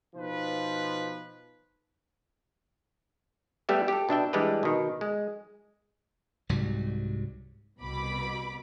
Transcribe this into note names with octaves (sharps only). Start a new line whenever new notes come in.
B2 F3 D#4 B4
G3 A3 B3 G4 E5
G4 A4
B2 D4 E5 G5
E3 G3 G#3 D4 G4 B4
B2 D#3
G#3
C2 G#2 F#3 G3
C2 B2 B5 D6